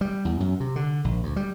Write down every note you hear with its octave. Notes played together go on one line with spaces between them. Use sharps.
G3
E2
F#2
C3
D3
A#1
D2
G3